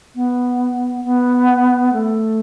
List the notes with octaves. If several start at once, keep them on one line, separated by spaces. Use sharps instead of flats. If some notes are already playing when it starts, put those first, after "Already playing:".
B3
B3
A3